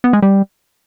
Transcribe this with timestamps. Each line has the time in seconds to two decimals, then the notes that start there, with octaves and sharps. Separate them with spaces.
0.04 B3
0.13 G#3
0.22 G3